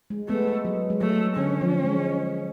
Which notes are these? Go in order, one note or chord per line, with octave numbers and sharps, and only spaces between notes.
G#3
G#3 A3 B3
G#3
F#3
G#3
F#3 A3
D3 C#4
F3
G#3